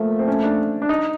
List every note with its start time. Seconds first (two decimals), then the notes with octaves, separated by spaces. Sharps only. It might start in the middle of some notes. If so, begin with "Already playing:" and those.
Already playing: A#2 F3 A3 A#3
0.19 C4
0.27 C#4
0.43 D4
0.82 D4
0.89 D#4